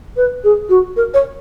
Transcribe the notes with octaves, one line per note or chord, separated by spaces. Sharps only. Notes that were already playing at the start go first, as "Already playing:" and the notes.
B4
G#4
F#4
A#4
C#5